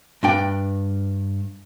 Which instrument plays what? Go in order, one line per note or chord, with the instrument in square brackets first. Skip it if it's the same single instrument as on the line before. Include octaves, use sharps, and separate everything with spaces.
[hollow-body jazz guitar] G2 D4 G5